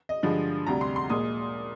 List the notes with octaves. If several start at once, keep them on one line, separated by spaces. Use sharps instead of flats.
D#5
G2 D3 F3 G#3
D2 C3 G3 A#5
C6
C6
A#2 G#3 D#6